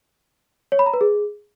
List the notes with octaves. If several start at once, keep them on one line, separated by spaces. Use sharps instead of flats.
C#5
B5
A#5
B4
G#4